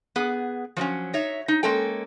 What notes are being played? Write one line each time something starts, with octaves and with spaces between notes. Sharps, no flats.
B3 G#4
F3 F#3 A#3 C#4
D#4 C#5 E5
D#4
G#3 A#3 C#4 A4 G5